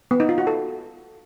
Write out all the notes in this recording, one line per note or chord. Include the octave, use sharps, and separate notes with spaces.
B3
D#4
F4
F#4
A4